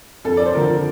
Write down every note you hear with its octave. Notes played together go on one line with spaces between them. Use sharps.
F2 A4
D5
C5
D3 F3 A#4